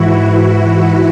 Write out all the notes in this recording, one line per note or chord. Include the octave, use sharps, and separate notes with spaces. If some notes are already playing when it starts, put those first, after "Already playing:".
Already playing: G#2 E3 E4 F#4
F#4